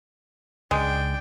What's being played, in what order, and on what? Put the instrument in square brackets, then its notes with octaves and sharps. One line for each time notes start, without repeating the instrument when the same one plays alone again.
[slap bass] C#2 [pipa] G#3 [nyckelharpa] D4 G5